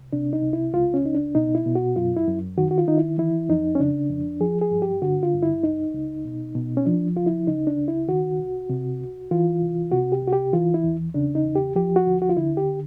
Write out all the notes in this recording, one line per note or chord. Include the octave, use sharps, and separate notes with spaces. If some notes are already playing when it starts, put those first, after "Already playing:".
Already playing: C2
C3 D4
D#4
C2
E4
C#2 F4
C#4
C#2 D#4
D4
B2 D#4
E4
B2
F#4
F#2 F4
E4
F#2
D#3 F#4
F#4
F4
D#3 D#4
E4
E3 E4
F2 D#4
C#4
C#3 D4
F2
F3 G#4
G#4
G2
G4
D3 F#4
F4
G2
E4
C#2 D#4
C#2
B2
B2
C#4
F3 D4
C#2 F4
E4
C#3 D#4
D4
C#2
E4
D#3 F#4
C2
C3
C2
E3 F4
C2
C3 F#4
G4
C2 F#4
G4
E3 F4
E4
E2
C#3 D4
D#4
E2
G4
F3 G4
F#4
D2
F#4
F4
D3 E4
G4